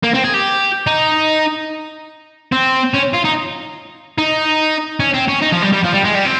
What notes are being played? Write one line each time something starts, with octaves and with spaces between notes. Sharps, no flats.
A#3
C4
G#4
G4
D#4
C4
C#4
F4
D#4
D#4
C#4
C4
C#4
D#4
F3
G3
G3
F3
G3
G#3
G3
C4